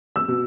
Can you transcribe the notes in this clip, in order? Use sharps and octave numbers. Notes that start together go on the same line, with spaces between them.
E6
B2